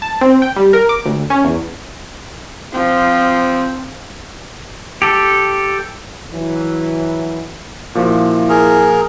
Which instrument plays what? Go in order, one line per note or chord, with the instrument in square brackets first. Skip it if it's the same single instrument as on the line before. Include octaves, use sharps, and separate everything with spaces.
[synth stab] A5
C4
G5
G3
A#4
D6
D2
C#4
E2
[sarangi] F3 [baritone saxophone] C4
[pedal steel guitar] G4 A4
[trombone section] E3 F#3
[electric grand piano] A#2 F3 F#4 [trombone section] E4
[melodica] G#4 A#4